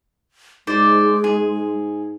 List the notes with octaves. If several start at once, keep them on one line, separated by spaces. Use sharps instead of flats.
G#2 G#3 C5 D5
G#2 G#4